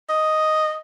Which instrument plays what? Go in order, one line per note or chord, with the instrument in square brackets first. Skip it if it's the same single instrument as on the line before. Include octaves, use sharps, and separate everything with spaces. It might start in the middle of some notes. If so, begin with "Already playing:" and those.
[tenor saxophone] D#5